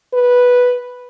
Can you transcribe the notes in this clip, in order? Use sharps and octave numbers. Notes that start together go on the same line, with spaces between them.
B4